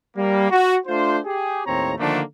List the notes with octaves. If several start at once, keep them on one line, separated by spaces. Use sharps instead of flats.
G3 A#3
F#4
A3 D4 F4 C5
G4 G#4
D#2 A2 C4 C#5 A#5
D3 D#3 F3 A3 A#3 D4